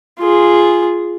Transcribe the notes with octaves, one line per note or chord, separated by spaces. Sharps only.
F4 G#4